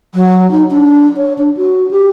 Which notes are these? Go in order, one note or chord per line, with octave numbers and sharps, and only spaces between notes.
F#3
D#4
D4
C#5
D4
F#4
G4